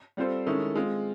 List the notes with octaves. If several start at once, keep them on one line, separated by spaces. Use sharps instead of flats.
G3 C4 F4 A4 C5
D#3 G#3 C#4 E4 A4
G#3 C4 F4